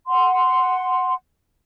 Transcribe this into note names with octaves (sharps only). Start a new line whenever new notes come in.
F#5 C6